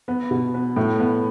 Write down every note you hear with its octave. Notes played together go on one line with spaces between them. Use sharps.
B3
B2
B3
A2
B3